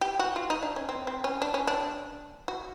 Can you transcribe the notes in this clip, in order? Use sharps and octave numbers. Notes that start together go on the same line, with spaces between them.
G4
F#4
F4
D#4
D4
C#4
C4
C4
C#4
D4
C#4
D4
F#4